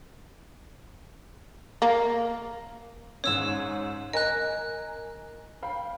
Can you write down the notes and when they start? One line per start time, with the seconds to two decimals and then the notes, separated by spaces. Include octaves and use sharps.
1.82 A#3
3.24 G#2 C#4 C#5 E6 E7
4.13 A#4 D#5 G#5 A#5 F#6
5.63 F5 G5 B5